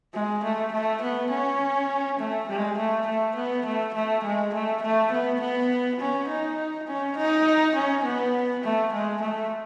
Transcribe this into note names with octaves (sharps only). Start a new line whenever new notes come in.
G#3
A3
A3
B3
C#4
A3
G#3
A3
A3
B3
A3
A3
G#3
A3
A3
B3
B3
C#4
D#4
C#4
D#4
C#4
B3
A3
G#3
A3